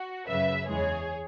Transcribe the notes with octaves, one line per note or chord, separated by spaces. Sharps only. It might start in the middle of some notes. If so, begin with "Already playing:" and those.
Already playing: F#4
F#2 C#3 F#3 B4 E5
E2 E3 G#3 G#4 C#5